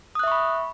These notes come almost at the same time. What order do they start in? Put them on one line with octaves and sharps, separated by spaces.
D#6 F#6 E5 C#6 B5